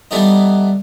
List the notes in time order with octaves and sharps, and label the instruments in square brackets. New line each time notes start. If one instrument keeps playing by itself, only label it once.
[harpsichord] E3 G3 A3 B3 D#4